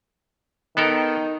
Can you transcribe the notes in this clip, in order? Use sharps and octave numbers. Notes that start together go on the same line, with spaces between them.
D#3 B3 A4 A#4